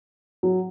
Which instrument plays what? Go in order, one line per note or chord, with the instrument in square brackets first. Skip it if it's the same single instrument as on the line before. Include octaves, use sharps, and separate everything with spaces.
[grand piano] F#3